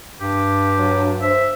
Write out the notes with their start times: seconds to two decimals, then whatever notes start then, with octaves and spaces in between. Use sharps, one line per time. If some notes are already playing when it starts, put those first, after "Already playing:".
0.21 G2 G4
0.79 F#3
1.22 C5 E5